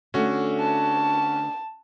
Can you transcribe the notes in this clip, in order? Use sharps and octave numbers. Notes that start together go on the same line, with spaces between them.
D3 A3 C#4 F#4
A5